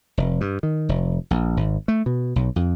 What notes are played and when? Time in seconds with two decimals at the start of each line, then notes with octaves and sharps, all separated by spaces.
0.17 F1
0.41 G2
0.63 D#3
0.89 F1
1.31 A#1
1.57 G#1
1.88 A3
2.06 B2
2.36 B1
2.56 F2